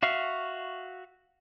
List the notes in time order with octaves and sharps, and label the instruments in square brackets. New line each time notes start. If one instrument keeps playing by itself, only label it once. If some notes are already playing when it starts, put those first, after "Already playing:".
[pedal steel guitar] F#4 E5 F5 C#6